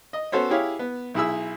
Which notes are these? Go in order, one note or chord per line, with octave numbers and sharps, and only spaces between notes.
D#5
B3 C#4 F#4 A4 C5 C#5
E4 G4 G#4 C#5 F5
B3
B1 E4 G#4 E6